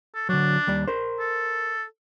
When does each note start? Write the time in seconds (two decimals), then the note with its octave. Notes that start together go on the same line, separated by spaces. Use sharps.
0.15 A4
0.29 D3 F#3 D4
0.67 D#2 G3 D5
0.87 A#4 C5
1.19 A4